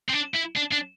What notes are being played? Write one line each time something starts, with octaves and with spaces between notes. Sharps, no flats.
C4
D4
E4
D4
D4